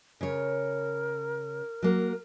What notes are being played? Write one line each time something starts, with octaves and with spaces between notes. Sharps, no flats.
C#3 A#4 C#5
F#3 A#3